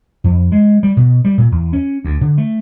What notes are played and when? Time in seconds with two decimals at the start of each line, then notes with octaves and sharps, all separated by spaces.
0.24 F2
0.52 G#3
0.83 G3
0.97 B2
1.24 G3
1.38 A#2
1.52 E2
1.73 C#4
2.04 D2
2.21 D3
2.38 A3